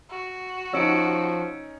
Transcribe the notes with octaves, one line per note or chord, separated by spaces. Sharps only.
F#4
F3 C#4 D#4 E6 C#7 D7